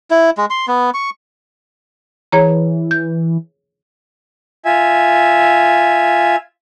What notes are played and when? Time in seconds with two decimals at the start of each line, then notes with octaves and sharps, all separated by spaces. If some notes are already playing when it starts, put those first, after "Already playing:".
0.11 E4
0.38 G#3
0.50 C6
0.68 B3
0.94 C#6
2.32 E3 G#4 C#5 A#5
2.91 G6
4.65 F4 E5 G#5